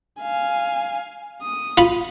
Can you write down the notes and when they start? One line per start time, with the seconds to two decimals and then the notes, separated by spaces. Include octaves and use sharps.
0.22 F5 G#5
1.42 D#6
1.78 F4 B5